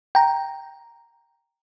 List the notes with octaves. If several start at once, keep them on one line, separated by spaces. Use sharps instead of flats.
G5 A#5